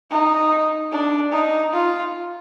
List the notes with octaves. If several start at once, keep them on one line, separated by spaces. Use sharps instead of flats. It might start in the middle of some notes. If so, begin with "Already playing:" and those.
D#4
D4
D#4
F4